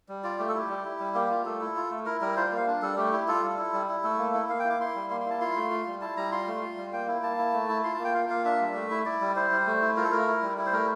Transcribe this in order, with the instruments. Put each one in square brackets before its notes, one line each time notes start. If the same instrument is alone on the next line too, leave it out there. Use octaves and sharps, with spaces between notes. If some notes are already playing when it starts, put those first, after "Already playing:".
[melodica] G3
F4 D5
A3 G4
A4
E4 G4
G3
E4
G3
A#3 G4
F4
A3 A4
E4
F4
A3
E4 A#4
G3 A#4
F4 C5
A#3 F5
D4
G3 A4
A3 G4
E4
F4 A4
G3
E4
G3
E4
A3 A4
A#3
E4
A#3 F5
G5
E4
D6
E4 C6
G3
A#3 C6
C6
E4 A5
F4 C6
A3
F4
G3
E4 A5
G3 A#5
F4 C6
A3
F4
G3
A#3 G5
E4
A#3 A5
E4
A3
E4
F4 C6
A5
A#3
G5
F4 F5
A#3 F5
D4 E5
G3
A3
E4
E4 D5
G3
E4 C5
G3
A3
E4
F4 A#4
A4
A3 A#4
E4
G3
E4
C5
A3 A#4